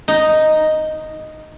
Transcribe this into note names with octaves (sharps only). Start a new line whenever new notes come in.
D#4